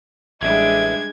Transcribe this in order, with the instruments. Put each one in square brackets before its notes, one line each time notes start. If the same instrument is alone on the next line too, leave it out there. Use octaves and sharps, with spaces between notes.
[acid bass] A1 [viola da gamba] G3 G#3 D4 [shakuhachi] E5 [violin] G#6